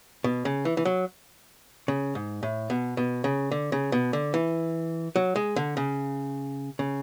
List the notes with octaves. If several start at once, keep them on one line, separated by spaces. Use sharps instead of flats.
B2
C#3
E3
E3
F#3
C#3
G#2
A2
B2
B2
C#3
D3
C#3
B2
D3
E3
F#3
G#3
D3
C#3
C#3